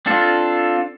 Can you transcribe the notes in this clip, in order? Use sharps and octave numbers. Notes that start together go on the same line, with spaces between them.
C4 D4 F4 A4